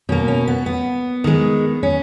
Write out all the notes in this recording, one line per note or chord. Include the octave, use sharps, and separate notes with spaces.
B2 A#3 C#4
C#4
B3
B3
D#3 G#3
C#4